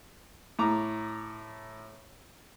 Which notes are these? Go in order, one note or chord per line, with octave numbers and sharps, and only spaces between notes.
A2 A#5 D6